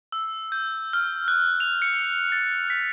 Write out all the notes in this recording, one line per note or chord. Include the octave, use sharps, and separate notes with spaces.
E6
G6
F6
F#6
F7
C#7
A6
B6